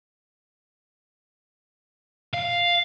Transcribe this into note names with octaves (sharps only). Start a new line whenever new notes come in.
F5